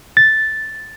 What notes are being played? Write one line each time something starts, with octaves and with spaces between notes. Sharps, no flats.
A6